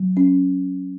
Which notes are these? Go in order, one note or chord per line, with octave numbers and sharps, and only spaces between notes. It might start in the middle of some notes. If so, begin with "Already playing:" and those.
Already playing: F#3
C#4